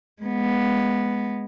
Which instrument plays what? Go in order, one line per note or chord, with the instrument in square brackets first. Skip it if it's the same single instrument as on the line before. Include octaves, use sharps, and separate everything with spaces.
[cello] G#3 B3